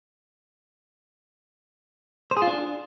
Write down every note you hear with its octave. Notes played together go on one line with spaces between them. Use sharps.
C5
G#4
F4
D4